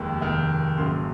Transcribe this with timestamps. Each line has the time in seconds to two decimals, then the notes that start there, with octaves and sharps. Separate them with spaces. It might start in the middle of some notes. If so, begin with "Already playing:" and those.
Already playing: F1 D#2 D#3 G#3
0.21 F1 D#2 D#3 G#3
0.78 G#1 F#2 C#3 F#3 A#3 C6